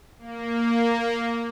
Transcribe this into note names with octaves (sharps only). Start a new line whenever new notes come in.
A#3